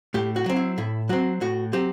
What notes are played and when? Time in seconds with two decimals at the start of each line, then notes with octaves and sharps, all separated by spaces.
0.14 A2 G4
0.36 F#4
0.46 F#3 C4
0.56 E4
0.78 A2 E4
1.09 F#3 C4 F#4
1.41 A2 F#4
1.73 F#3 C4 G4